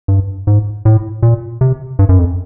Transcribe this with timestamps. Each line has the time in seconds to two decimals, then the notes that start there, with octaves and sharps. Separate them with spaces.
0.08 G2
0.47 G#2
0.85 A2
1.23 A#2
1.61 C3
1.99 G2
2.09 F#2
2.19 F2